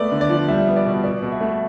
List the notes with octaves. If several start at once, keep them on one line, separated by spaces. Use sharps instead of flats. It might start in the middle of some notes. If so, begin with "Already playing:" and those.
Already playing: A3 B3 D5
D3
D5
F3
G3 E5
B3
D5
B2
B2 D5
B2
E5
A3